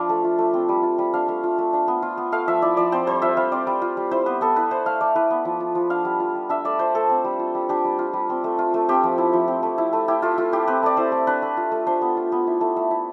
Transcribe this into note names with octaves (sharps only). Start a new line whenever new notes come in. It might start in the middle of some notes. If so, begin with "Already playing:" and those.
Already playing: F3 D4 B4 D5 F5
A3
F4
A3
C4
G3
F4
G3
D4 F5
A3
F4
A3
D4
B3
F4
B3
A3 F5
F3 E5
E4 D5
F3 D5
C4 C5
G3 C5
F4 E5
G3 F5
C4 D5
G3
F4
G3
E4 C5
B3 B4
B3 A4
E4 B4
E4 C5
A3 F5
A3 D5
E4 B4
B3
F3
F4
F3
D4 F5
G3
F4
G3
D4 E5
A3 D5
F4 C5
A3 A4
C4
G3
F4
G3
D4 G4
G3
F4
G3
C4
A3
F4
A3
C4 G4
F3
E4
F3
C4
A3
E4
A3
E4 G4
A3 F4
A3 F4
E4 G4
C4 B4
A3 D5
E4 C5
A3
D4 B4
A3
F4
A3
D4 C5
B3
F4
B3
E4
A3
A3
E4